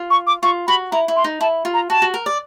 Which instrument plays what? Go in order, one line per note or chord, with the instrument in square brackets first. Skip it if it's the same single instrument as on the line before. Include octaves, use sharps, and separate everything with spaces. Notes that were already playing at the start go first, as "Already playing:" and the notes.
Already playing: [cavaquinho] F4
[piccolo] C#6
D6
[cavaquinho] F4 [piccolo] C#6
[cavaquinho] F#4 [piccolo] B5
[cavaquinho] E4 [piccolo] A#5
[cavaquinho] E4
[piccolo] C6
[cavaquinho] D#4
[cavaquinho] E4 [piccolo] A5
[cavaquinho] F4
[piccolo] A#5
[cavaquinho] F#4 [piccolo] A5
[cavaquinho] F#4
A#4
D5